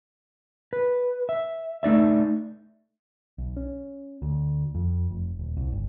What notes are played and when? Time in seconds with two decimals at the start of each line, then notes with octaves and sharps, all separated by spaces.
0.73 B4
1.29 E5
1.83 A3 D#4 D5 E5
3.38 B1
3.57 C#4
4.22 D2
4.75 F2
5.11 F1
5.39 D#1
5.57 C2
5.72 G1